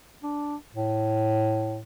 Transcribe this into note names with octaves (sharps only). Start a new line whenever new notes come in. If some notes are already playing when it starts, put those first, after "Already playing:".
D4
A2